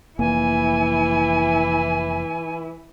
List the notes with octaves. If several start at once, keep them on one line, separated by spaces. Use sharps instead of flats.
F1 E3 A#3 E4 G#5